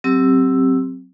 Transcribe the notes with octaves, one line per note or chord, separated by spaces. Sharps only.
F#3 C4 G4 E6